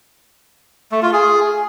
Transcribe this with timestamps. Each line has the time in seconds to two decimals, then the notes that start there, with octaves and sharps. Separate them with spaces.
0.92 A3
1.02 F4
1.13 G#4